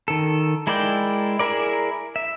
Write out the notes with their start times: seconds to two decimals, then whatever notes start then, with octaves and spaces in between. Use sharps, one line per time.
0.08 D#3 A4
0.67 G#3 E4 A#4 D5 G5
1.39 E4 G#4 A#4 D5
2.16 E5